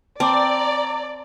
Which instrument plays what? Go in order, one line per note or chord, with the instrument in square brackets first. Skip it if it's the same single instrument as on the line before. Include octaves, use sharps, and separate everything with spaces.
[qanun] C4 [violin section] D5 [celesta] A5 D6 [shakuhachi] A#5